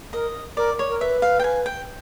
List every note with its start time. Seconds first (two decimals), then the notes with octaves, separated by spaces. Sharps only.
0.13 A#4 D#5
0.57 A#4 D5
0.79 C#5
0.89 A#4
1.00 B4 E5
1.22 F5
1.39 G5
1.44 G#5
1.66 G5